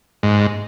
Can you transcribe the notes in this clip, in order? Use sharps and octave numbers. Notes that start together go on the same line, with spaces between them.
G#2